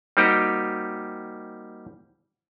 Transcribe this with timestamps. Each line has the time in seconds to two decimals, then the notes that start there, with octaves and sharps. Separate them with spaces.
0.17 G3 A#3 C4 D#4 F#4 G4